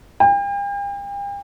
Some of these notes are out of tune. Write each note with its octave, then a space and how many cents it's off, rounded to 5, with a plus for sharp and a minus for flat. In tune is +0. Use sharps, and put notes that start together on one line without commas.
G5 +40